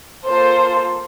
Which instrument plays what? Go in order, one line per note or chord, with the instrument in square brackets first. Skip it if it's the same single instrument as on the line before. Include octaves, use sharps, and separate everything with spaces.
[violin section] A#3 F4 A4 C5